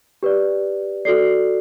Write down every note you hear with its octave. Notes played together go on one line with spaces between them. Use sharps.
G4 B4 D5
F#4 A4 D5 C7